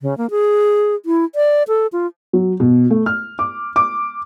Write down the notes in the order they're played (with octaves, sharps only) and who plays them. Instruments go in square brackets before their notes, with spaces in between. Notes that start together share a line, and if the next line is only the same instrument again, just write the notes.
[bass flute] C#3
A#3
G#4
E4
D5
A4
F4
[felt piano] F#3
B2
A3
F6
D6
D6